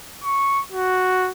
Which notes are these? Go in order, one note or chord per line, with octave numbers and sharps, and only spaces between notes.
C#6
F#4